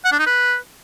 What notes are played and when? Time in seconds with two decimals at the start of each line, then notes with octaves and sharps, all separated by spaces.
0.05 F#5
0.12 D4
0.19 D#4
0.26 B4